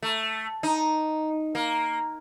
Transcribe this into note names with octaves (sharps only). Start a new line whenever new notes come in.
A3
D#4
A#3